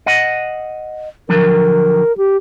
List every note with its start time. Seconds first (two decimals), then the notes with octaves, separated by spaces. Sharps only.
0.06 D#5 F#5
1.29 D3 F3 F#3 A#4
2.17 G4